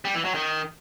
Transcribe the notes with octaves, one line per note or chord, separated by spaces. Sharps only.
G3
E3
F#3
D#3